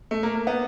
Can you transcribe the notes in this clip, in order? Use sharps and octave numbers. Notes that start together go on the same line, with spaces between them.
A3
A#3
A#3
B3